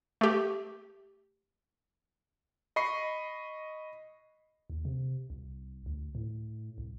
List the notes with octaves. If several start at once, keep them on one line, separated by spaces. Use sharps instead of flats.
A3 G4
D#5 B5 C#6 C7
D#2
C3
C2
D2
A2
C2